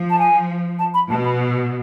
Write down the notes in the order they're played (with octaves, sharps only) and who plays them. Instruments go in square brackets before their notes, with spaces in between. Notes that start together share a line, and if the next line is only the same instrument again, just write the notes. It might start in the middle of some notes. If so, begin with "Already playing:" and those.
Already playing: [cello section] F3
[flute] A5
G#5
A5
B5
[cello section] B2 [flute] A5
[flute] B5